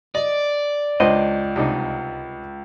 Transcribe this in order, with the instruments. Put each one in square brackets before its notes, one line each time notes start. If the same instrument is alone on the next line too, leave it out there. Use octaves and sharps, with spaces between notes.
[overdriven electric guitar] D5 [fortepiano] D#5
[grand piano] C#2 [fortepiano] C#4 D4 C5 [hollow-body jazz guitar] D#5
[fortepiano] C2 D4 D#4